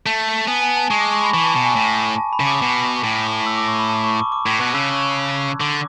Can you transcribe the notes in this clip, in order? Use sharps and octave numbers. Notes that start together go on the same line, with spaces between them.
A3 A5
B3 G#5
G#5
A5
G#3 C#6
D6
C#6
B5
E3 C#6
A5
B2 A5
G#5
A2
A5
B5
C#3
D6
B2
A2
E6
D6
C#6
B5
A5
C#6
D6
D6
A2 G#6
B2 F#6
C#3 E6
D3 D6